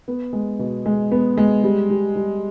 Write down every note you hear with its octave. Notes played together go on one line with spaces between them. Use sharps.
B3
G#3
B2
G#3
B3
G#3
G3
G3
G3